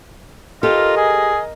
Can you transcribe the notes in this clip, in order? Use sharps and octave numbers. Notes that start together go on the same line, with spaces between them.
F4 G4 A4 A#4 D#5
G#4